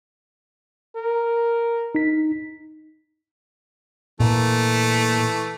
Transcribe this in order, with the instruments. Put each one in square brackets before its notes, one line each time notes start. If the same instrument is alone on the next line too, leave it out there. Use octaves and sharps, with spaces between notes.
[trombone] A#4
[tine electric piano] D#4 B6
[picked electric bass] A#2 [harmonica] E3 A3